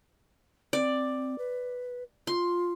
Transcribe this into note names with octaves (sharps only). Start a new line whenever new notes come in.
C4 D5
B4
F4 C6